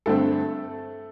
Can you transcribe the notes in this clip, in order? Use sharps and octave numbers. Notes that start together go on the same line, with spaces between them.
G2 D3 A3 C4 A4